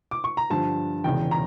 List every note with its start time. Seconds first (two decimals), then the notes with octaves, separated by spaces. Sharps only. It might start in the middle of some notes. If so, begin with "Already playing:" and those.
0.11 D6
0.24 C#6
0.37 A#5
0.50 G2 D3 F3 A5
1.04 E1 E2 C#3 G5
1.31 A#5